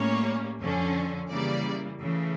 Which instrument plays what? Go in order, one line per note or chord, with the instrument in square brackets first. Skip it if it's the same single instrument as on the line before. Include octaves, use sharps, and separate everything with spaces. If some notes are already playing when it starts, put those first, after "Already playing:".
Already playing: [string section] A2 G3 A#3 C#4 C#5
F2 D3 F3 C#4
C#3 E3 G3 A#3 D5
C#3 E3 A3